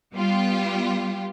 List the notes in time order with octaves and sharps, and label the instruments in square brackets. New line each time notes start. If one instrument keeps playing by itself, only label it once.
[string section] G3 B3 F4 G4